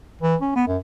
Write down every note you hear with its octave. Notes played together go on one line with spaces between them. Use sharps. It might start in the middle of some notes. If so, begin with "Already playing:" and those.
E3
C#4
B3
F#2